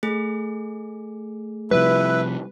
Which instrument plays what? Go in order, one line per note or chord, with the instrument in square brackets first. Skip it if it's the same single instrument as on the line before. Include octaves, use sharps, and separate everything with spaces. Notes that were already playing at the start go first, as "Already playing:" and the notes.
[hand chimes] A3 G#4
[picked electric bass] C3 F3 G3 [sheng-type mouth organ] E4 [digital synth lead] B4